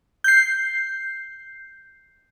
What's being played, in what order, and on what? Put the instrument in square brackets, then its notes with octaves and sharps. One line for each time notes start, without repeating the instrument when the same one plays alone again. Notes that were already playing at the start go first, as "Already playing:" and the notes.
[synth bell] G6 C7